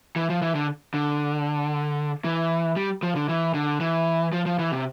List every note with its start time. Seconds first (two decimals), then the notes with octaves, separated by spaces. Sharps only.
0.16 E3
0.30 F3
0.42 E3
0.55 D3
0.94 D3
2.24 E3
2.76 G3
3.03 F3
3.16 D3
3.29 E3
3.54 D3
3.80 E3
4.33 F3
4.46 F3
4.59 E3
4.72 C3